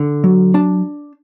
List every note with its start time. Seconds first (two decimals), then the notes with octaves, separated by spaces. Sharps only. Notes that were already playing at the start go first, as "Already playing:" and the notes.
Already playing: D3
0.24 F#3
0.54 D4 A5